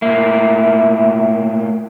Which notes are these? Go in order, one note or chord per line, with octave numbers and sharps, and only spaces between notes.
A2 A#3 E4